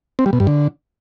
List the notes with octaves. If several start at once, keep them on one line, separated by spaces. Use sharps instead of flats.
C4
G3
B2
G2
D3